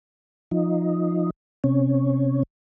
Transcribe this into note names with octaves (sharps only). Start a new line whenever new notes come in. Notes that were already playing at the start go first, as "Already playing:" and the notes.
F3 D#4
C3 C#4